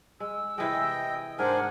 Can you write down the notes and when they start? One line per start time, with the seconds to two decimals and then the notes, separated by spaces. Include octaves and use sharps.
0.20 G#3 E6
0.58 C3 E3 G#3 D#5 G5
1.39 G#2 D4 A#4 C5 F#5 G#5